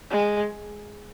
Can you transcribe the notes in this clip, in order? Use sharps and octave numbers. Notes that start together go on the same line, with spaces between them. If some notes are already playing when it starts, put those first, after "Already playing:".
G#3